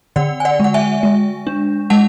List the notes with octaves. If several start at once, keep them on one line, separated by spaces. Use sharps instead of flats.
D3 D5 F#5
G#5
D5 F#5
G#3 F#5
E5 G#5
G#3
D4
G#3 F#5 A5